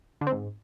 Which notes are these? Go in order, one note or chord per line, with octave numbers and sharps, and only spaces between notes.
D3
C4
G#2